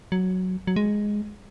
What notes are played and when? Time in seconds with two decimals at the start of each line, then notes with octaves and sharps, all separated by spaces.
0.12 F#3
0.67 F#3
0.76 G#3